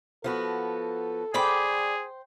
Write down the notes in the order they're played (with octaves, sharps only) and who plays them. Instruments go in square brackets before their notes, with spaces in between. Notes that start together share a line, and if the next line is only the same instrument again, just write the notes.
[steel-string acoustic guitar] F3 B3 F#4 [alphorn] A4
[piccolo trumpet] G#4 [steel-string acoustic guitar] C5 G5 [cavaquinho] D5 B5 D6